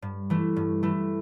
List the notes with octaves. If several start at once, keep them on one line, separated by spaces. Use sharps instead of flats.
G2
E3 A3
G2
E3 A3